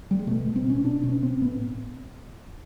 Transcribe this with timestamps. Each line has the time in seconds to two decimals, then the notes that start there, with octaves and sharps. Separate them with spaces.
0.11 G3
0.19 G#3
0.27 B2 A3
0.46 B2
0.56 C4
0.66 B2 C#4
0.84 B2 D4
1.03 B2 C#4
1.22 B2 C4
1.41 A2 B3